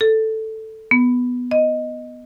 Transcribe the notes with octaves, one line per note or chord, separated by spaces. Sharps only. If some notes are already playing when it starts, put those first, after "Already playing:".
A4
B3
D#5